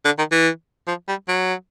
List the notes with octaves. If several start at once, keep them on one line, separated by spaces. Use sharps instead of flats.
D3
D#3
E3
F3
G3
F#3